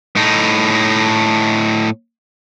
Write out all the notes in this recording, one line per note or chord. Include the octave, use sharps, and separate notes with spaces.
A2 D#4